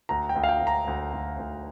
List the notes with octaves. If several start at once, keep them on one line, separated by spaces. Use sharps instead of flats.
D2 A#5
G5
D2
F5
G5
D2
A#5
D2
D2
D2